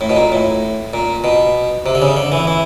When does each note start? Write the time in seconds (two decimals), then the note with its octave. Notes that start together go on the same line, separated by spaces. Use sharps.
0.01 A2
0.09 B2
0.16 A#2
0.32 A2
0.94 A#2
1.24 B2
1.86 C3
1.95 D3
2.02 C#3
2.17 D3
2.32 E3
2.47 E3